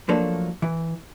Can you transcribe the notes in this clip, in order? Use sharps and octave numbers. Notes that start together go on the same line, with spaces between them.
F3 F#3 A3 A#3 D4 A4
E3